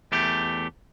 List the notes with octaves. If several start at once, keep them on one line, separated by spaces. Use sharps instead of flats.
E2 A3 G4